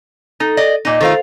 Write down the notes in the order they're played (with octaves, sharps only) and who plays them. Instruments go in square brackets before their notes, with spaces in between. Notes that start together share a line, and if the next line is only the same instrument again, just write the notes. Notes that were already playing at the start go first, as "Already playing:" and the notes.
[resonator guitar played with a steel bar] D#4 [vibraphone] A4
[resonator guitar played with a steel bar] D5 D#5
[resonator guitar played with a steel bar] A#2 D#4 [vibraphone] D#5
[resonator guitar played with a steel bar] D#3 A3 F4 [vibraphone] A4 C5 F5